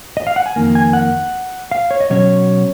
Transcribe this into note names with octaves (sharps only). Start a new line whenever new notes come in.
D#5
F5
F#5
G#5
F2 D#3 A#3
G#5
F#5
F5
C#5
D#5
B2 F#3 C#4 C#5